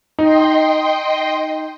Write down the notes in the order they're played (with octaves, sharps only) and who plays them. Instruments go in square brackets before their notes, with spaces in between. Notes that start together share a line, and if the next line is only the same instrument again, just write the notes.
[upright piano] D#4 [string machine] D#5 G5 C6